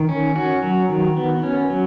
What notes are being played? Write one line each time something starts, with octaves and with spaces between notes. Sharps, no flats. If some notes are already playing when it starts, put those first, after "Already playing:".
Already playing: D#3
C#4
C#4 F#4
F#3
D#3
B3
C#4
F#3